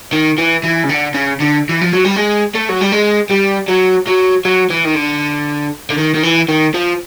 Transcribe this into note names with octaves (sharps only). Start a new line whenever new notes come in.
D#3
E3
E3
C#3
D3
C#3
D3
E3
F3
F#3
G3
G#3
A3
F#3
G3
G#3
G3
F#3
F#3
F#3
E3
D#3
D3
D3
D#3
D#3
E3
D#3
F3